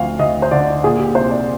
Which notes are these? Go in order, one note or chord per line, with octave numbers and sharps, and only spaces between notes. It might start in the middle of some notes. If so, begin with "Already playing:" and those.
Already playing: D2 F3 F5
D2 D#5
C5
D3 D5
A#2 G#4
G4
C2 C5
D5